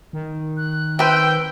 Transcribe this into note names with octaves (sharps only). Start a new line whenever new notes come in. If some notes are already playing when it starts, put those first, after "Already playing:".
D#3
F#6
C4 B4 G5 E6